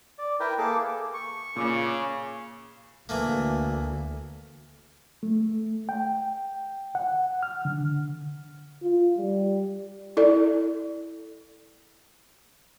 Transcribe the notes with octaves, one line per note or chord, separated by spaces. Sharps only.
D5
E4 A#4 B4 G5
A#3 G#4 A4 D6
C#6
A#2 C#3 D6
D2 E3 A3 A#3
A3
G5
F#5
F6
D3
F4
G3
E4 A4 D5